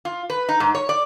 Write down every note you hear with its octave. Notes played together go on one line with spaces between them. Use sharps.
F4
B4
D#4
G#2
C#5
D5